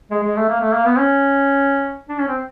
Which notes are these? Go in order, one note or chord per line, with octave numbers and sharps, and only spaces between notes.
G#3
G#3
A3
A#3
A3
A#3
B3
C#4
D4
C#4
C4